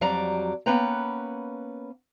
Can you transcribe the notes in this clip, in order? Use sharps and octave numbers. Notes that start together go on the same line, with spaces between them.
F2 F#3 G3 D5 A#5
A#3 B3 C#4 B4 G5 A#5